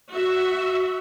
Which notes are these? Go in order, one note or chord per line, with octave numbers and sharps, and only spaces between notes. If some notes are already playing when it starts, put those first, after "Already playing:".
F#4 E5